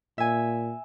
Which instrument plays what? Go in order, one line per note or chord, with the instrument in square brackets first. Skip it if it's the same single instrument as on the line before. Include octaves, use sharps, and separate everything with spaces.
[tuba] A#2 [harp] E5 G#5